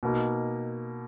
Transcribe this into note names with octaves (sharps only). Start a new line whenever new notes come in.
B2 A#3 D#4